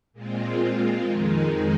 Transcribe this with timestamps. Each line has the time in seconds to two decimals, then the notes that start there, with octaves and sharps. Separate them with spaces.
0.13 A#2 G#3 C4 F4
1.03 F2 D#3 G#3 D#4